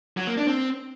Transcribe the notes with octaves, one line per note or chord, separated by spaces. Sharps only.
F#3
A#3
D4
C4